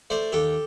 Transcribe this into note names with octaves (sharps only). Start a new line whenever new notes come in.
A3 C5 D5
D#2 G4 A4